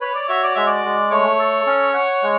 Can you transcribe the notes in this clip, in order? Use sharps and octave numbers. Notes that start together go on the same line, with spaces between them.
B4 C#5
D5
F#4 E5
D5
G#3 E5
D5
G#3
A3 C#5
A4
C#4
F#5
G#3